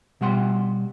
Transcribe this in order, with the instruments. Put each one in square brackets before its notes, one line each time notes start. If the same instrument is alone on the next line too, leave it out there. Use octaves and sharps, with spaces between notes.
[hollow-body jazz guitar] B2 G3 F#5 C6